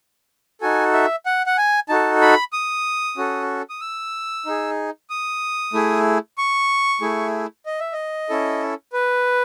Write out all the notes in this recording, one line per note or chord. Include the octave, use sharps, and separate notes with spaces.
D#4 F#4 A4 G#5
E5
F#5
F#5
G#5
D#4 F#4 A4 A5
B5
D#6
C#4 F#4 A4
D#6
E6
D#4 G#4
D#6
A3 E4 G#4
C#6
A3 E4 G#4
D#5
E5
D#5
C#4 E4 A4
B4